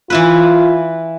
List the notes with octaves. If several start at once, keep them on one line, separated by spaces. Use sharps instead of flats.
E3 E4 F4 B4